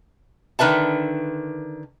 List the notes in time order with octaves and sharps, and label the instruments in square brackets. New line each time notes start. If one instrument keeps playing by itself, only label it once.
[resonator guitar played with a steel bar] D3 D#3 B4 E5 A5